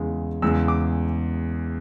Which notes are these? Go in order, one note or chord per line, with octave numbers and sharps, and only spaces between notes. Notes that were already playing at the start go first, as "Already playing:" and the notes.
Already playing: E2 C#3 G#3
E2 C#3 G#3 E6
D6